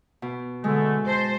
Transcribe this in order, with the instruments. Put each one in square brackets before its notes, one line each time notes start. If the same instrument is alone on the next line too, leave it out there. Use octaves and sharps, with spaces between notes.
[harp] B2
[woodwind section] D3 A3 [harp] G#3
[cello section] C5 [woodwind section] D#5 A5 C6